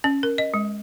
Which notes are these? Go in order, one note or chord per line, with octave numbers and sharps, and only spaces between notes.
C#4
A#4
D#5
G#3